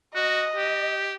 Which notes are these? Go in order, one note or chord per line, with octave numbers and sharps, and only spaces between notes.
F#4 D#5
G4